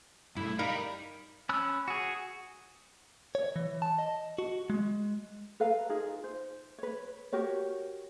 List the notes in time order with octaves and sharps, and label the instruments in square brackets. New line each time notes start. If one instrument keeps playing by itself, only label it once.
[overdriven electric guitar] G2 A3 [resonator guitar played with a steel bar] E4
[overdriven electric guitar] G3 [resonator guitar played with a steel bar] D#4 A#4 F5 [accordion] B5
[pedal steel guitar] C#4 B5 E6 F#6
F#4 G#4
[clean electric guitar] C#5
E3
A5
D#5
F#4
G#3
[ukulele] A4 B4 F5 A#5
D#4 F4 G#4
C5
B4 C#5
F#4 G4 A#4 C#5